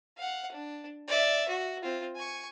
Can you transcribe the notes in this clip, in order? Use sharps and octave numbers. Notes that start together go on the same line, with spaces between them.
F5 F#5
D4
D5 E5
F#4
C4 F4
G#5 C#6